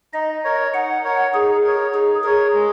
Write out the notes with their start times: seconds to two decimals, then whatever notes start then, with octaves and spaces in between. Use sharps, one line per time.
0.14 D#4 D#5
0.44 A#4 C#5
0.73 D#4 F#5
1.04 A#4 C#5
1.33 D#4 G#4
1.64 A#4 C#5
1.94 D#4 G#4
2.24 G#4 A#4 C#5
2.54 G#3